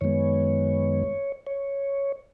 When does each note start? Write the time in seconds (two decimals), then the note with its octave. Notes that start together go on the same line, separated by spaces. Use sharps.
0.01 F#2 D#3 G#3 B3 C#5
1.47 C#5